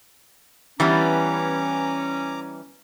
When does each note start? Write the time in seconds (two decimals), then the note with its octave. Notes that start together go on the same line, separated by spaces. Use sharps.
0.80 E3 G3 B3 C#4 A#5 D6